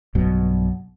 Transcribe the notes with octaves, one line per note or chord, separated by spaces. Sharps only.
B1 G2 B2 F#3